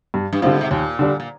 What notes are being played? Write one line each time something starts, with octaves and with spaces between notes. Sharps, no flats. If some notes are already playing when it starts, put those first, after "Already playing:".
G2
G2
G#2 D3 G3 C4 F4
C3
D#2 A#2
D3 G3 D4
A#2